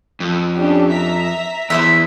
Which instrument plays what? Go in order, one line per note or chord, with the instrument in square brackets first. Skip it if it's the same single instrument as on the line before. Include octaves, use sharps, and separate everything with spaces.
[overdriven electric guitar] F2
[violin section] C#4 D4 G4
E5 A#5 B6
[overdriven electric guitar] E2 [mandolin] E4 C5 E5